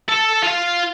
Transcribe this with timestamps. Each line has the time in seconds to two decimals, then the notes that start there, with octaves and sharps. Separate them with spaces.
0.09 A4
0.43 F4 F5